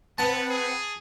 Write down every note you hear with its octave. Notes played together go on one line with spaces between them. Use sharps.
B3 C4 B4 F#5 A5
G#4